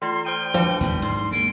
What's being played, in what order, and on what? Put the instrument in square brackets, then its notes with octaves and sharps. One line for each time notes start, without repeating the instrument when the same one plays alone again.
[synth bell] E3 A3 F4 [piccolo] C6
[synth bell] C5 D#6 D#7 [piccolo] G5
[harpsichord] F3 [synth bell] F#3 A3 D4
[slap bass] D#2 A2 G#3
[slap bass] G#2 [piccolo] C6
[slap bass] G#3 A#3 [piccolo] D7